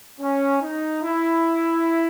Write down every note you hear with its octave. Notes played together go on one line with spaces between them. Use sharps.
C#4
D#4
E4